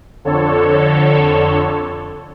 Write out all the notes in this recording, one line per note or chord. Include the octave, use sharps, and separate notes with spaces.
F2 D3 A4 C#5